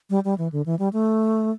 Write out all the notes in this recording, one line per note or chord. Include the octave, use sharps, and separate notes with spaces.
G3
G3
E3
D3
E3
G3
A3